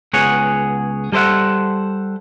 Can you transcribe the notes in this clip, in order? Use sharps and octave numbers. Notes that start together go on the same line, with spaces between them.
C#2 B3 G#4 C#5 F#5
G3 A4 C5 E5 F#5